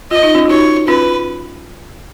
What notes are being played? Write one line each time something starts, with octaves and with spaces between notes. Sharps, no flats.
F4 D#5
D#4
C#4 F4
F4
D#4 F#4 C#5
C#4 F4 B4